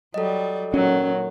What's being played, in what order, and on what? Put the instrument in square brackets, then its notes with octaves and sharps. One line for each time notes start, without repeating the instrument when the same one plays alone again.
[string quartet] F#3 G3 [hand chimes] A4 D#5
[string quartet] A#2 D#3 [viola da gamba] F#3 [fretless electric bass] C#4